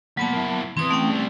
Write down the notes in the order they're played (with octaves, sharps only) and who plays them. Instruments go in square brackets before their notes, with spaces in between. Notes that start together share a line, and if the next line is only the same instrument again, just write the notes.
[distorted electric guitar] A#2 A#3 [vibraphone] F#3 B3 A5
[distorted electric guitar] A#3 E4
[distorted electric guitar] E3 B3 [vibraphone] C4 D#6
[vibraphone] A3 C#4 G5
[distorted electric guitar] G3 C4